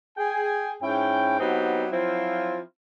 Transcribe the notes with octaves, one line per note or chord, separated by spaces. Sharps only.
G#4 G5 G#5
G#2 C#4 E4 G5
F#3 B3 C4 D#4 E4 G4
F3 F#3 C4 E4 F4